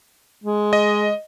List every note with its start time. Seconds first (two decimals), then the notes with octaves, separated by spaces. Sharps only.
0.44 G#3
0.73 D#5